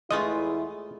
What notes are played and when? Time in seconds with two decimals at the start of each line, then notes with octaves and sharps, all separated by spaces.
0.11 E2 G#3 A3 E4 F4 D#5